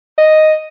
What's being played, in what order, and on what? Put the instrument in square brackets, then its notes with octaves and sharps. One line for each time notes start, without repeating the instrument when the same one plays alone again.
[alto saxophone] D#5